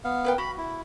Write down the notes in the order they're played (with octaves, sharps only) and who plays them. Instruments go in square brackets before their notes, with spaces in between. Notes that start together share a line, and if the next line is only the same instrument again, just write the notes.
[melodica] B3 F5
[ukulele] A#4 B4 G5
[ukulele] F#4 [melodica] B5
[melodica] E4